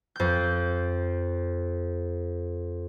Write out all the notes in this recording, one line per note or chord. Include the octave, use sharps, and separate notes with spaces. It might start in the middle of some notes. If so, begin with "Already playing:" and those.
F2 G6